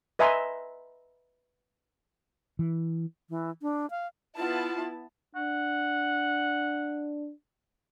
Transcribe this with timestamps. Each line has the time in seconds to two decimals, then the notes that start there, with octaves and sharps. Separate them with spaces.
0.19 B4 D#5 E5 G#5 A#5 C6
2.59 E3
3.30 E3
3.62 D4
3.90 F5
4.37 B3 E4 F4 A5
5.35 D4 F#5